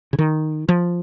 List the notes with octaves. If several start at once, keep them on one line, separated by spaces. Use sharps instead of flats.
C#3
D#3
F3